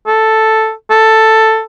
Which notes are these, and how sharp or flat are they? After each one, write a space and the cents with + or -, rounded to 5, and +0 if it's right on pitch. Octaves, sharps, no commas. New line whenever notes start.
A4 +0
A4 +5